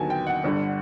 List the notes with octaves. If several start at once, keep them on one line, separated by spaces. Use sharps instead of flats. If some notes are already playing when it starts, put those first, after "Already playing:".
Already playing: D#2 D3 F#3 B3 G#5 A5
G5
F#5
G1 G2 D3